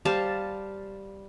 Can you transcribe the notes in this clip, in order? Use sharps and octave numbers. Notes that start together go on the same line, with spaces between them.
G3 C5 F5 A5